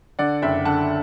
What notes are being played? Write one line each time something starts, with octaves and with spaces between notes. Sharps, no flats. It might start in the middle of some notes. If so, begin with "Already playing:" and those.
D3 D5 F#5
F#1 E5 G5
D3 F#5 A5